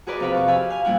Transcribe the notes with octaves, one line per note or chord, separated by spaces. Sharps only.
F#4 G#4 A#4 B4 D5 D#5
F2 C3 F5 F#5 B5
F2 C#6
G4 F5 G#5 B5 E6
F5 G#5
F2 A#2 G3 E4 F#5 G#5